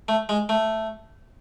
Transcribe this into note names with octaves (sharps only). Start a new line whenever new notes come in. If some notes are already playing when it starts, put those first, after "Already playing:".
A3
G#3
A3